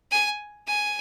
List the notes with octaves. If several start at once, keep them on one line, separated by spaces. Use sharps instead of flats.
G#5
G#5